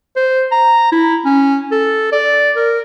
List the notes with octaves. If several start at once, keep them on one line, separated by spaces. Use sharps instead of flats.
C5
A#5
E4
C#4
A4
D5
A#4